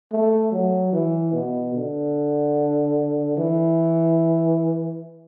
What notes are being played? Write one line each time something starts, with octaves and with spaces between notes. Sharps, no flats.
A3
F#3
E3
B2
D3
E3